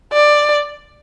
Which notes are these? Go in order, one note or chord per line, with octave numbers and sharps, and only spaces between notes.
D5